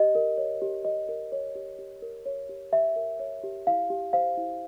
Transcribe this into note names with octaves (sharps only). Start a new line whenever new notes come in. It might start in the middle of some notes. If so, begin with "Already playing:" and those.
Already playing: G4 D#5
A#4
C#5
G4
G4 D#5
A#4
C#5
G4
G4
A#4
C#5
G4
G4 E5
A#4
C#5
G4
E4 F5
G4
C5 F5
E4